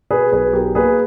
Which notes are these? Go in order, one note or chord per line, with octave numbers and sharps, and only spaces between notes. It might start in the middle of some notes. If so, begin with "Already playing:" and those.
B2 G#4 B4
B1 G#4 B4
B1 G4 A#4
A#3 G#4 B4